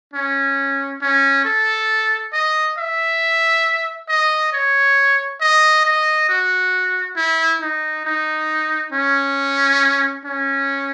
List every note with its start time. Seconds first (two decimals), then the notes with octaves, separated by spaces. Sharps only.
0.14 C#4
1.02 C#4
1.45 A4
2.33 D#5
2.78 E5
4.09 D#5
4.53 C#5
5.41 D#5
5.85 D#5
6.29 F#4
7.17 E4
7.62 D#4
8.05 D#4
8.93 C#4
10.25 C#4